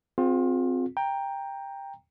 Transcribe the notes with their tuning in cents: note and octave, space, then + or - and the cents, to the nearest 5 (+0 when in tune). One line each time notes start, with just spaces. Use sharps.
C4 -10 F4 +30 G#4 +0
G5 +15 A#5 +0